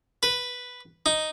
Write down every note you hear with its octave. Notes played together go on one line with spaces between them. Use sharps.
B4
D#4